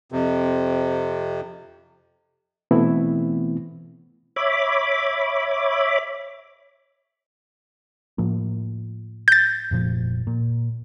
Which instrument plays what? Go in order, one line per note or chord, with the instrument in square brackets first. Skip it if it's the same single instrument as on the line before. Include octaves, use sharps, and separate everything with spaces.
[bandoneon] F2 C3
[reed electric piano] B2 E3 A3 B3 C4 E4
[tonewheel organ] C#5 E5 B5 D6
[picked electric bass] A2 F3 A#3
[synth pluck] G6 A6
[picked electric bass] F1 A#2 F3
A#2